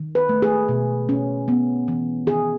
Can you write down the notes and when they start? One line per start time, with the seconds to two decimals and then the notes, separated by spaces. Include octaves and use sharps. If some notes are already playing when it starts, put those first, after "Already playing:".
Already playing: D#3
0.15 B4
0.29 A3
0.42 G#4
0.68 B2
1.09 C#4
1.48 B3
1.88 E3
2.27 D#3 G#4